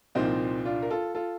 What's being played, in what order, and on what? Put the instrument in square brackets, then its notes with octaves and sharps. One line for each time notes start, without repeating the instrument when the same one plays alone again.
[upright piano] C2 A#2 F3 C4 D#4
D4 F4
A#4
F4 A4
F4 A4